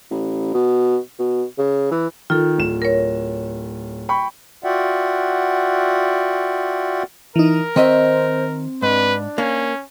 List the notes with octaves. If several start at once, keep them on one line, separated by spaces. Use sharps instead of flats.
A1
B2
B2
C#3
E3
D#3 F4 A4
D1 E7
A#4 C#5
G5 B5 C#6
F4 F#4 D5 E5 F#5 G5
E3 D#4 A#4
D#3 C4 C5 D#5 E5
G#2 D4 B4
A#3 C#4